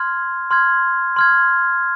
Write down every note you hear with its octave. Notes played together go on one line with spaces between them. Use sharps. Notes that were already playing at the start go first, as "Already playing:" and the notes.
Already playing: C6 F6 G#6
C6 F6 G#6
C6 F6 G#6